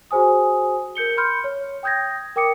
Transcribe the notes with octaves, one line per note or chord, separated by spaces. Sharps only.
F#4 G#4 C5 G#5 D#6
A#4 G6 C#7 G7
B5 C6 F6 G6 C#7
C#5
G5 D#6 G6 G#6 A#6
A#4 G5 D6 D#6 C#7